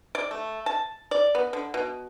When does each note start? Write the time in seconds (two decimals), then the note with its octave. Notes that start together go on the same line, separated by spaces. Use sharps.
0.15 D5
0.31 A3
0.66 A5
1.11 D5
1.35 B3
1.53 D3
1.74 B2